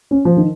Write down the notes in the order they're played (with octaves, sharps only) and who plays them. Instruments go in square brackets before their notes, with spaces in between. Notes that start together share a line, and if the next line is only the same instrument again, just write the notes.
[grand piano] C#4
F3
D#3